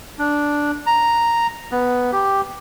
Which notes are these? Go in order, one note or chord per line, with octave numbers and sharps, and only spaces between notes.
D4
A#5
B3
G4